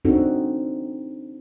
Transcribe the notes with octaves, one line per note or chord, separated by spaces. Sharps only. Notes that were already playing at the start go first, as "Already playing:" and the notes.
C4 D4 D#4 F#4 A4